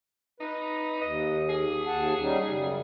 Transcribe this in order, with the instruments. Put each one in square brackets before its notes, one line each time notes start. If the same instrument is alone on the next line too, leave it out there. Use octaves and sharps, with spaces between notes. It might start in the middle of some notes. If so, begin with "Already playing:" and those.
[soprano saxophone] D#4 [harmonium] B4
[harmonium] D#2 [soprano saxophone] D#5
[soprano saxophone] G#4
[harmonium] D#2 F#5 A5
G3 C#4 D#4
F#2 C#3 G3